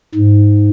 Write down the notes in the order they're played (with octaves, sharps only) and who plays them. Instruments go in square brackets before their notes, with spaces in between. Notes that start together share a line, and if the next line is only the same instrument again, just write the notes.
[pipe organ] G#2